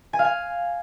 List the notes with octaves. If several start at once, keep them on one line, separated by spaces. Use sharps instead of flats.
G#5
F5
G#5